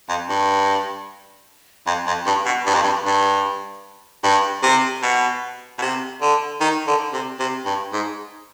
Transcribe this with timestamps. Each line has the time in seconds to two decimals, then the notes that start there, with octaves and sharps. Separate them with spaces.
0.09 F2
0.29 G2
1.87 F2
2.07 F2
2.26 G2
2.45 B2
2.66 G2
2.74 F2
2.83 G2
3.05 G2
4.24 G2
4.63 C3
5.03 B2
5.78 B2
5.82 C3
6.22 D3
6.60 D#3
6.87 D3
7.13 C3
7.39 C3
7.65 G2
7.93 G#2